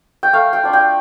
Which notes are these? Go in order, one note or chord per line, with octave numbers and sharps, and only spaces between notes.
G5
A3 F5
G5
D4 F4
G5